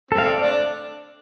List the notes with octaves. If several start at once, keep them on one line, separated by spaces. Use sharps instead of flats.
C4 A4
F5
D5
A3 D4